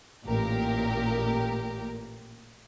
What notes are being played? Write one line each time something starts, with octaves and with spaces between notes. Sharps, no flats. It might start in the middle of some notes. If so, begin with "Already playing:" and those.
A1 A#2 G4 A#4